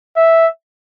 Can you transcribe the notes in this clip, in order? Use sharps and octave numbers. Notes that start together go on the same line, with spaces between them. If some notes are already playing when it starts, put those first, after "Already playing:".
E5